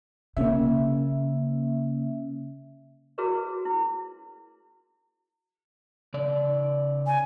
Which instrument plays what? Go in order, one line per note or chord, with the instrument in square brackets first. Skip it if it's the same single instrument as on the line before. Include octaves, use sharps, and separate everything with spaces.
[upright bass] C#3 [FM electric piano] A#3 C#4 E5
[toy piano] E4 F#4 G#4 A#4 B4 C#5
E4
[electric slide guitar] C#3 D5
[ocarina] G#5